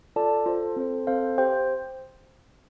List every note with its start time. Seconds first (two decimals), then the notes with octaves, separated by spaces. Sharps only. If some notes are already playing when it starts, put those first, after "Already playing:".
0.16 F4 A4 D5 A5
0.46 F4 A4 C5
0.76 C4 A4 C5
1.07 C4 A4 C5 F5
1.38 G4 C5 G5